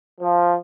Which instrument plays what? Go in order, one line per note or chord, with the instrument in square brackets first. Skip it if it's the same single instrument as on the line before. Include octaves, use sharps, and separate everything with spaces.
[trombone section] F3